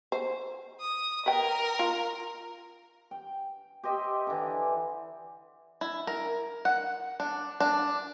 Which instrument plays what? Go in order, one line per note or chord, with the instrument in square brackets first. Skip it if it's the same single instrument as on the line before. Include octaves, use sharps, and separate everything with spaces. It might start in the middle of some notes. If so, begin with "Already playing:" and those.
[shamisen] C5
[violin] D#6
[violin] A#4 [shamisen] B4 G5
[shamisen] F4
[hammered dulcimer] G5
G4 C5 D#5 E5
D3 E3
[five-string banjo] E4
A#4
F#5
D4
D4